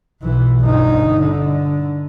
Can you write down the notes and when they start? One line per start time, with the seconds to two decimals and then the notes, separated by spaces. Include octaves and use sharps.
0.21 B1 E3
0.61 G1 D#4
1.21 D3